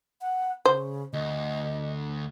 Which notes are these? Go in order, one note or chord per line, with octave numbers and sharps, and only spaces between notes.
F#5
C#3 C5
D2 D#5